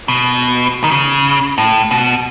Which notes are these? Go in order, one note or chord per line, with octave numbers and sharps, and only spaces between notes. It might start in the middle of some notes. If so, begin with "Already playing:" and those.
B2
D#3
C#3
A2
B2